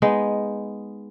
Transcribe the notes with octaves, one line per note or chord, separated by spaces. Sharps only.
G#3 B3 D#4